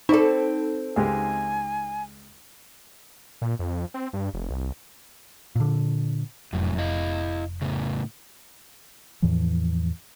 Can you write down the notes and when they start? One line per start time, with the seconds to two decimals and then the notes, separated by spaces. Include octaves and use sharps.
0.09 C4 D#4 A4 D5 C#6
0.96 C#2 G#3 G4 G#5
3.42 A#2
3.59 F2
3.94 C4
4.13 G2
4.34 F1
4.50 C2
5.55 A#2 D3
6.53 F1 F#2 A2
6.78 E4 D#5 F5
7.61 A2 C#3
9.22 E2 A2 E3 F3